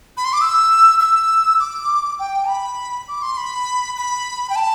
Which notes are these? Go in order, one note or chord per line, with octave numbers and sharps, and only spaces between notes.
B5
C6
D6
E6
E6
D6
G5
B5
D6
C6
B5
B5
G5
A5